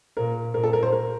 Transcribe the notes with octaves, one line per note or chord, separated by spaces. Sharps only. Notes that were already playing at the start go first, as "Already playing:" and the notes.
A#2 A#4
A#2 A#4
A4
A#4
C5
A#4